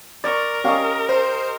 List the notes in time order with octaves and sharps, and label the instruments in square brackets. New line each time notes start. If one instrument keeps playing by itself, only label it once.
[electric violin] A#4 [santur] D5 C#6
[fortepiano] C#4 F5 C#6 [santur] G4 D#5
[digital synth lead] C5 [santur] C6